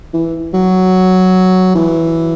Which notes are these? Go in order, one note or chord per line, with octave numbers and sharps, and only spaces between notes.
E3
F#3
E3